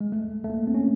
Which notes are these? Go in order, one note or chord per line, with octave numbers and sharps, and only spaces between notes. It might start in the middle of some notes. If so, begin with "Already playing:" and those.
G#3
A3
A3
A#3
C4
C#4